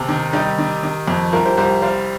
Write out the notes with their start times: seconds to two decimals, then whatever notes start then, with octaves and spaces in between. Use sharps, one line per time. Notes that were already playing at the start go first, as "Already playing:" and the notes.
Already playing: D#2 C3
0.09 D#3
0.33 G3 D#4 G4
0.58 D#3
0.83 D#3
1.08 F2
1.33 C2 F4 A#4
1.45 G4 C5
1.57 C2 G4 C5
1.82 G3 C5 F5